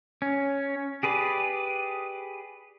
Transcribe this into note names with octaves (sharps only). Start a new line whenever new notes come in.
C#4
G4 G#4 B4 D5